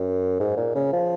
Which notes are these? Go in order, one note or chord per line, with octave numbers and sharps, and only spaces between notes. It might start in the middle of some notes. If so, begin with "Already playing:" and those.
Already playing: F#2
G#2
A#2
C#3
F3